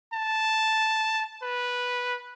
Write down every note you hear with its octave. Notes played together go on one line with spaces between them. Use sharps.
A5
B4